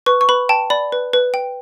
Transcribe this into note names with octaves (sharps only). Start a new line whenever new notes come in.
B4 C#6
C#6
B4 B5
G5 A5
D5 B5
B4
B4
G5